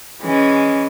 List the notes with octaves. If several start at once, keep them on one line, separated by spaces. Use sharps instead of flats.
E3 G#3 C#4